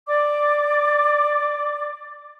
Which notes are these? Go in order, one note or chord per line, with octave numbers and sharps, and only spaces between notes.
D5 D6